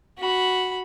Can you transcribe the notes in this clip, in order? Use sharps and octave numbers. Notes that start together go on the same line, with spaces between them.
F#4 B5